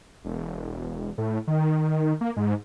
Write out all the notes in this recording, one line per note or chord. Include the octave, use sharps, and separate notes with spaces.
E1
A2
D#3
A#3
G#2